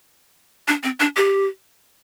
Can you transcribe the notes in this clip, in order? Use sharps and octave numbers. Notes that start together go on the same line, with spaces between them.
D4
C4
D4
G4